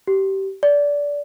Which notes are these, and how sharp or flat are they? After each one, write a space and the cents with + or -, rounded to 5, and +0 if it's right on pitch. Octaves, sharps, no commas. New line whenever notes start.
G4 -20
D5 -20